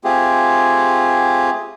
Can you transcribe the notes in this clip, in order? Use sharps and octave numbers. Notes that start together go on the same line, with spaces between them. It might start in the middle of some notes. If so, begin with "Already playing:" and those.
A3 C4 F4 G4 G#4